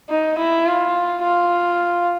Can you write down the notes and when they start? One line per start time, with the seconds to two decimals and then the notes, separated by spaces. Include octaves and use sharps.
0.10 D#4
0.38 E4
0.67 F4
1.24 F4